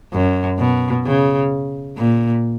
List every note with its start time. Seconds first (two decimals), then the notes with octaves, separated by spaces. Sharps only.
0.13 F#2
0.59 B2
1.06 C#3
1.98 A#2